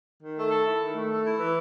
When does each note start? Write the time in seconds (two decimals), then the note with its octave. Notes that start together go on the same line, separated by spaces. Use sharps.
0.22 D#3
0.37 A3
0.51 A4
0.66 E4
0.80 D#3
0.95 A3
1.10 A4
1.24 E4
1.39 E3